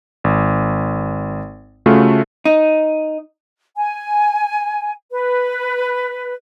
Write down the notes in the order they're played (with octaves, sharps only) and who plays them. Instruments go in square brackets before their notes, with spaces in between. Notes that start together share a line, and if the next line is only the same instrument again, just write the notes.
[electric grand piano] G#1
C#3 A3 F4 F#4
[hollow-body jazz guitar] D#4
[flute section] G#5
B4